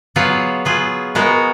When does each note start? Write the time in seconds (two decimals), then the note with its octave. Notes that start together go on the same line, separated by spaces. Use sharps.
0.16 F#3 B3 F4 G#4 B4
0.65 F#3 B3 F4 G#4 B4
1.15 G#3 B3 F#4 A#4